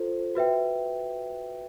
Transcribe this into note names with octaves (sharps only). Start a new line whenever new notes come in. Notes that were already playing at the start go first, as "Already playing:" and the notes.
Already playing: F4 A4 C5
F#4 B4 E5 G5